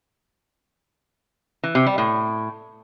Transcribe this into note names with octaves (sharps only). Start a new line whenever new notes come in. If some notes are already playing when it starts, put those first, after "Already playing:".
E3
C3
G3
A2